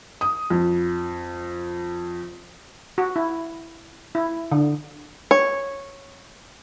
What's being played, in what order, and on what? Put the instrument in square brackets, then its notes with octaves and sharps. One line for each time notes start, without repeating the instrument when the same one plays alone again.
[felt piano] D#6
F2
[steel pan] F#4
E4
E4
D3
[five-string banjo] C#5